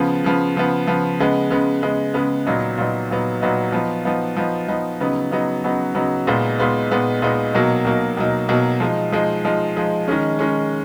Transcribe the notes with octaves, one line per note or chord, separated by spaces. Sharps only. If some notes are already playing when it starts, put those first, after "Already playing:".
Already playing: C#3 F3 B3
C#3 F3 B3
C#3 F3 B3
C#3 F3 B3
C#3 G#3 B3
C#3 G#3 B3
C#3 G#3 B3
C#3 G#3 B3
A#2 F#3 B3 D#4
A#2 F#3 B3 D#4
A#2 F#3 B3 D#4
A#2 F#3 B3 D#4
F3 B3 D#4
F3 B3 D#4
F3 B3 D#4
F3 B3 D#4
C#3 F#3 B3 D#4
C#3 F#3 B3 D#4
C#3 F#3 B3 D#4
C#3 F#3 B3 D#4
A#2 G#3 B3 D#4
A#2 G#3 B3 D#4
A#2 G#3 B3 D#4
A#2 G#3 B3 D#4
B2 F#3 A#3 D#4
B2 F#3 A#3 D#4
B2 F#3 A#3 D#4
B2 F#3 A#3 D#4
F3 G#3 D#4
F3 G#3 D#4
F3 G#3 D#4
F3 G#3 D#4
D#3 G#3 C#4
D#3 G#3 C#4